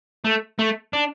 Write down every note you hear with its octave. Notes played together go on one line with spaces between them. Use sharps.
A3
A3
D4